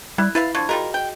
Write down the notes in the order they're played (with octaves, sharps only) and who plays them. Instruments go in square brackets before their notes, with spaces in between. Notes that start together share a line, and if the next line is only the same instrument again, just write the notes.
[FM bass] G3 [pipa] E4 [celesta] F#6 G#6
[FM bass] E4 [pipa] B4 E5 F5 [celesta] A6
[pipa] D3 F3 D4 [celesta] C#6 G#6
[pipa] G3 F4 A#4 [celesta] F#4 G#4 D#5
[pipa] G5